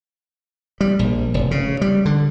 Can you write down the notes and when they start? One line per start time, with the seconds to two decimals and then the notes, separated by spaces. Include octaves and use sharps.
0.81 G3
0.99 A#1
1.34 F1
1.51 C#3
1.81 G3
2.05 D3